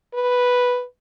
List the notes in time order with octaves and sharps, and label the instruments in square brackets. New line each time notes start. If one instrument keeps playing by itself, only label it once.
[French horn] B4